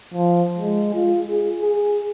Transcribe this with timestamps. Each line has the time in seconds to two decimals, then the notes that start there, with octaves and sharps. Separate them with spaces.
0.14 F3
0.59 G#3
0.94 F4
1.28 G#4
1.62 G#4